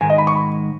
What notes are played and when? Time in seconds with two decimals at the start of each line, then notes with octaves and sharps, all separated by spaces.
0.01 G#2 D#3 G#3 G#5
0.10 D#5
0.18 B5
0.27 C#6
0.35 B5